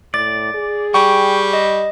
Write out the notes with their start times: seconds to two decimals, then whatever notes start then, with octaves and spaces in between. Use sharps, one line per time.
0.14 A2 D5 A6
0.54 G#4
0.94 G3 G5 C#6
1.53 D#5